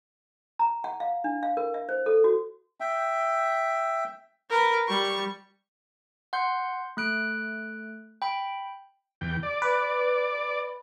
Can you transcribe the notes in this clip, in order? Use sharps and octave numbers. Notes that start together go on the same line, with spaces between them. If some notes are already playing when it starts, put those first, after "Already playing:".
A#5
F#5
F5
D4
F5
A#4
E5
C5
A4
F#4
E5 G5
A#4 B4
G3 C#6
F#5 C6 G6
A3 F#6 D7
G5 B5
E2 G5
D5
B4